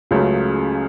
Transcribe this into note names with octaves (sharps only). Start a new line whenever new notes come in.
C#2 C#3 F#3 A3